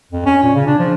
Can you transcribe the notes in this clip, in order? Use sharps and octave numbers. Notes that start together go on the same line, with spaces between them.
F2
C#4
A#2
C#3
D4
F3